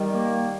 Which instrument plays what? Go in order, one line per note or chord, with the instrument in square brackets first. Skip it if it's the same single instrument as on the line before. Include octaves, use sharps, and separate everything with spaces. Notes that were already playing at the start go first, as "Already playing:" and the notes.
Already playing: [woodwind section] D#3 [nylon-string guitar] G3
[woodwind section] A#3